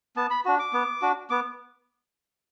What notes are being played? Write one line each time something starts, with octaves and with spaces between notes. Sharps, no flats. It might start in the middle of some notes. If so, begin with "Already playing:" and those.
B3 A5
B5
D4 F#4
D6
B3
D4 F#4
B3 D6